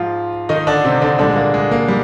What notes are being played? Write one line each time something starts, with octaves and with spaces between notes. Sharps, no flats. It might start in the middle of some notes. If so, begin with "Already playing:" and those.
Already playing: G#2 F3 F4
D#3 D#4
D3 D4
C3 C4
D3 D4
A#2 D3 G3 D4
G#3
A#3
G#3
A#3
G3